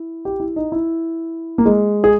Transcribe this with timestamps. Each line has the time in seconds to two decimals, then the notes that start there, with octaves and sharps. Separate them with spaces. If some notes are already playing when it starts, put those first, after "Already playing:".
Already playing: E4
0.25 G4
0.40 E4
0.56 D#4
0.72 E4
1.58 A#3
1.66 G#3
2.04 G#4